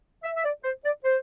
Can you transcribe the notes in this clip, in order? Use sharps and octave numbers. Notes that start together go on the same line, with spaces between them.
E5
E5
D5
C5
D5
C5